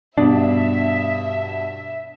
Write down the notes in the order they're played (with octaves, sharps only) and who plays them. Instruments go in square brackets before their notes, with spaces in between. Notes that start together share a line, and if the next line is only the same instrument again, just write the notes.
[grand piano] G2 B2 [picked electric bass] D4 [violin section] E5